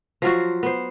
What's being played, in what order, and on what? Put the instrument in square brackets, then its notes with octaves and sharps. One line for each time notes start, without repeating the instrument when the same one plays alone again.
[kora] F3 F#3 F4 F#4
B3 C5